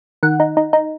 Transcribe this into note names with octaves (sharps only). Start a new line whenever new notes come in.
D#3 F#5
D#4
D#4
D#4